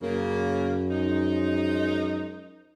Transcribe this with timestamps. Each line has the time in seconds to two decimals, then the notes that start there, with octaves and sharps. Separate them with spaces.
0.02 F#2 C#3 A#3
0.91 F3 G#3 D#4